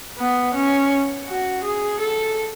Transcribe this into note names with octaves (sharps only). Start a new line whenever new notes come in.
B3
C#4
F#4
G#4
A4